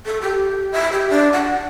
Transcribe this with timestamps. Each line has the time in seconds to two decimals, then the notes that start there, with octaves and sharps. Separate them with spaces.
0.06 A4
0.22 G4
0.72 E5
0.92 G4
1.10 D4
1.33 F#5